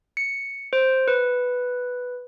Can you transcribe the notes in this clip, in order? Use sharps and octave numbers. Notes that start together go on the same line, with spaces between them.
C#7
C5
B4